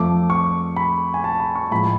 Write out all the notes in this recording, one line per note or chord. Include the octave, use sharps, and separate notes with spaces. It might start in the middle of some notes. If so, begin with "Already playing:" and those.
Already playing: F2 F3 A3 D6
C#6
B5
G#5
A5
B5
C#6
A2 F3 G#3 B5